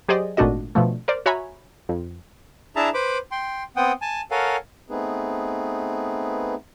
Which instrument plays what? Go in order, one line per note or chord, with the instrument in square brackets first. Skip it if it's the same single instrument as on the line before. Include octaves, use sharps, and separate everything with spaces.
[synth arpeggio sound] F#3 G4 G#4 C5 D5 D#5
G#1 A#2 A3 D4 F#4 D#5
B2 D3 F3 A3
A#4 C5 D5
F#4 C#5 E5 G#5 A#5 B5
F2
[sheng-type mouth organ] D4 E4 G#4 E5 A5 A#5
B4 C5 B5 D6
G5 C6
B3 C4 F#5 G5 D#6
G#5 A5
A4 A#4 C#5 F5 F#5 G#5
[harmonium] A3 B3 C4 D#4 G#4 B4